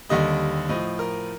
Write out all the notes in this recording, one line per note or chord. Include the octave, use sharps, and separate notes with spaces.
D#2 D3 G3 D#5
A2 F3 D#5
A#4